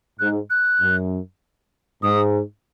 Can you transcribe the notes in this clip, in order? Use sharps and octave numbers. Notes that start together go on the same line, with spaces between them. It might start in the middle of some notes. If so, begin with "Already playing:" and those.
G#2 F#6
F#6
F#2
G#2 D#6